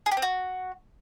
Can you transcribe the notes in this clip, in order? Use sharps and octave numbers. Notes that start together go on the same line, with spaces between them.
G#4
G4
C4
F#4